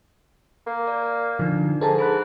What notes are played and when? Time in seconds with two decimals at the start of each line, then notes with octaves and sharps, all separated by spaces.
0.66 A#3
0.87 D5
1.39 D3 F3 D4 D#4
1.81 G#2 A4 A#4 A5
1.99 G#4 B5 F#6